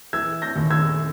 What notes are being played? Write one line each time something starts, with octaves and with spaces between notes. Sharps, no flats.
E3 E6 G#6
G6 A#6
D#2
E6 G#6